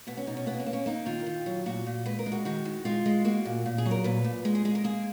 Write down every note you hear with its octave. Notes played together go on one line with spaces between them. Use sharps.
B2 B3
C#4
B2 D#4
C#4
A#3 B3
C#4
A#3
C#4
A#3 D#4
D#3 F4
D#3
F#3
A#2 F#4
A#2
G#3 B4
A#4
G#3
F#4
D#3 F#4
D#3
G#3 F4
G#3
A#3 F#4
A#2
A#2
G#4
F#3
A#4
A#2 B4
A#2
G#3 G#4
G#4
G#3 G#4
A#4
A#3 G#4